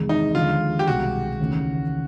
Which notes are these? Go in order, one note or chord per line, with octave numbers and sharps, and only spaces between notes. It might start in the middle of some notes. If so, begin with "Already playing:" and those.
Already playing: E2 C3 D#3 G#3
D#4
D#2 D3 F3 G#3 F4
G4
C2 B2 G#3 F#4
D#2 C#3 E3 A3